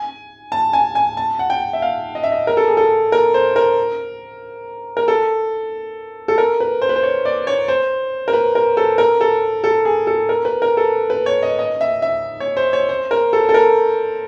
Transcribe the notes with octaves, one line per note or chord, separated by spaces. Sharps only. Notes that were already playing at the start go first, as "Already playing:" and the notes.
Already playing: G#5
A5
G#5
G#5
A5
F#5
G5
E5
F5
D#5
E5
D#5
A#4
A4
G#4
A4
A#4
C5
A#4
A#4
A4
A4
A#4
B4
C5
B4
C5
C#5
D5
C#5
C5
A#4
B4
A#4
A4
A#4
A4
A4
G#4
A4
A#4
B4
A#4
A4
B4
C#5
D#5
D#5
E5
E5
C#5
C5
C#5
C5
A#4
A4
A4
A#4